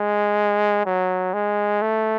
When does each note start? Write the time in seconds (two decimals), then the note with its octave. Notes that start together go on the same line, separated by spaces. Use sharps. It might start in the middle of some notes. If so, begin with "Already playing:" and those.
Already playing: G#3
0.85 F#3
1.33 G#3
1.82 A3